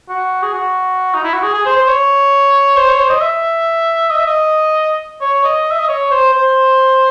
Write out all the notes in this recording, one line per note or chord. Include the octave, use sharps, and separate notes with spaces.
F#4
G#4
F#4
D#4
E4
F#4
G#4
G#4
C5
C5
C#5
C5
C#5
C5
D#5
E5
D#5
E5
D#5
C#5
D#5
E5
D#5
C#5
C5
C5